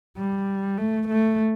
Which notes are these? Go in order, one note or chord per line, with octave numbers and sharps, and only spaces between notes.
G3
A3
A3